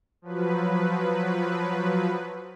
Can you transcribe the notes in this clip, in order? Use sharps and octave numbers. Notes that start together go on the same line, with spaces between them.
F3 F#3 B4